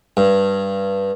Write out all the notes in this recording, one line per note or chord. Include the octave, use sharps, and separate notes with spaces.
G2